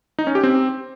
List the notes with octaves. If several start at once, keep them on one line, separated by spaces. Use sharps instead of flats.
D#4
C#4
G4
C4